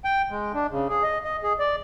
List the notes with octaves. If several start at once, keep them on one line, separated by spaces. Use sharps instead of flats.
G5
G#3
D4
C#3
G#4
D#5
D#5
G#4
D5